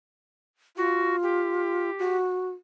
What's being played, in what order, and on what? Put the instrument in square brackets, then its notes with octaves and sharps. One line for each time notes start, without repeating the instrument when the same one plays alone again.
[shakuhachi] F4 [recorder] F#4
[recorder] G4
[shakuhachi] F#4